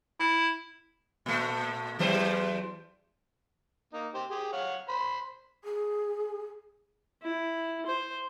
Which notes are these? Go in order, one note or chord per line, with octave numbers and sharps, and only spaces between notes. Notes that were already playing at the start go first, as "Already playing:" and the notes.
E4
A#2 A3
E2 F#3 C5
A#3 D#4
G4 C5
G4 G#4
C#5 F5 F#5
C5 B5 C6
G#4
E4
C5